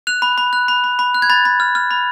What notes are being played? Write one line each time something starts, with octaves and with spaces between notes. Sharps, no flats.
F#6 F7
B5
B5
F#6
B5
B5
B5
F#6
G#6
B5 A6
B5
F6
F6
B5